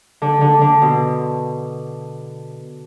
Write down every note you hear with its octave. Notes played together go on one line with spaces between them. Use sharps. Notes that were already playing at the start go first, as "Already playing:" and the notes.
D3
D3
D3
B2